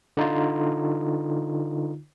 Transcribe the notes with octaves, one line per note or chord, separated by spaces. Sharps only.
D3 D#4 F4